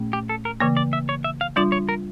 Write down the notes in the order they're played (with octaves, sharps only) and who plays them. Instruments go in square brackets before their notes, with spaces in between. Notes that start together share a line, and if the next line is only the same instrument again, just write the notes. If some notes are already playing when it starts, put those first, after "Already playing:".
Already playing: [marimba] A#2 A3 C#4
[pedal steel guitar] G4
A4
A#4
[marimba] C#3 E3 A#3 [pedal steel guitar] C#5
[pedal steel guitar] D5
E5
C#5
E5
F5
[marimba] G3 D4 F4 [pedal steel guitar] D5
[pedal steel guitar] C#5
A#4